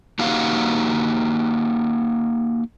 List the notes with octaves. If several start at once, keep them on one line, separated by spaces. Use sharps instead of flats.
A#3 D#4 F#4 G4 F5